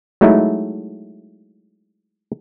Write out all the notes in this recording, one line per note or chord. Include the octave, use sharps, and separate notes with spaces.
F#3 G#3 A3 D#4 E4